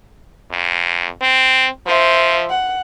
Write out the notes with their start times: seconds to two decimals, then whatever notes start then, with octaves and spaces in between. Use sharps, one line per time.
0.51 F2
1.21 C4
1.87 F3 C5 E5
2.50 F#5